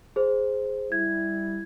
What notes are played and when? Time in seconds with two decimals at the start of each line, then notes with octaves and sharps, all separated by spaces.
0.16 G#4 C5
0.92 G3 E4 G#6